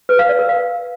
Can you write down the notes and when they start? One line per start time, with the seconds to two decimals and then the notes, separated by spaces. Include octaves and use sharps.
0.09 B4
0.19 F5
0.29 D5
0.39 A#4
0.49 F5